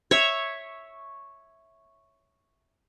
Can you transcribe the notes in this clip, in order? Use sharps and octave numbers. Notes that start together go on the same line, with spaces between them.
C#5 E5